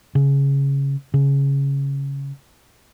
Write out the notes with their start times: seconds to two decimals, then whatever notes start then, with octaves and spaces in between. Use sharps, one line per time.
0.15 C#3
1.14 C#3